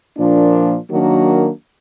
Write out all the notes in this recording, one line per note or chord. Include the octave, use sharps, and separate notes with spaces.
A#2 F3 A#3 D4
D#3 F#3 A#3 D4 F#4